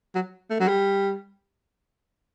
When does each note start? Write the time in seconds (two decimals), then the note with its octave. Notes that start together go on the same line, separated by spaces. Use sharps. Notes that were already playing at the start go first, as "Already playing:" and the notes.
0.15 F#3
0.50 A3
0.60 F#3
0.68 G3